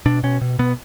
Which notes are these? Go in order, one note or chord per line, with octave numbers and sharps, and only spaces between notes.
B2 D4
B2 C#4
B2
B2 B3